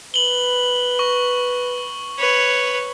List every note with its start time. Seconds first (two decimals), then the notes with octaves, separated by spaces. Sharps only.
0.14 B4 F#7 G7
0.99 C#6
2.19 B4 C#5